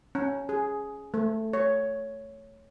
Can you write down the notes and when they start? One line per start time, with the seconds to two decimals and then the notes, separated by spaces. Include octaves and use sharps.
0.15 C#4
0.49 G#4
1.14 A3
1.53 C#5